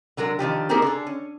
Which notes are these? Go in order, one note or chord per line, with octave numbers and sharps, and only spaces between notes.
D3 F#3 G#3 A#4
D3 D#3 F3 G4
A#3 C4 D#4 G4 G#4 A#4
D3 G#4 A4
C#4